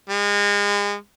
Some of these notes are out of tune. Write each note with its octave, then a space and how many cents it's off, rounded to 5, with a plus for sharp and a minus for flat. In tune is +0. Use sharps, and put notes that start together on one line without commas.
G#3 -35